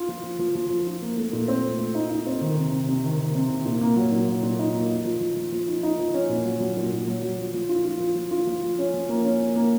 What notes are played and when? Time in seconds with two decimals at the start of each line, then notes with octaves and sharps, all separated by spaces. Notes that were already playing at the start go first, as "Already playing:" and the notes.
Already playing: F4
0.09 F3
0.23 F3
0.39 F3
0.55 F3
0.71 F3
0.87 F4
1.02 A#3
1.18 A3
1.33 A#2
1.48 C4
1.64 A3
1.79 A3
1.95 D#4
2.10 D#4
2.27 C4
2.41 D#3
2.57 C3
2.72 C3
2.88 C3
3.04 D#3
3.19 D#3
3.35 C3
3.50 C3
3.66 A#2
3.81 A#3
3.96 F#3
4.12 A#2
4.28 F#3
4.43 A#2
4.59 D#4
4.74 A#3
4.90 D#4
5.05 F3
5.21 F3
5.37 F3
5.52 F3
5.68 D#4
5.83 D#4
5.99 F3
6.14 C#4
6.29 A#2
6.45 F#3
6.60 F#3
6.77 A#2
6.92 A#2
7.08 F#3
7.22 F#3
7.38 F3
7.54 F3
7.69 F4
7.85 F4
8.00 F3
8.15 F3
8.31 F4
8.47 F3
8.63 F3
8.79 C#4
8.94 F3
9.09 A#3
9.25 C#4
9.40 A#3
9.56 A#3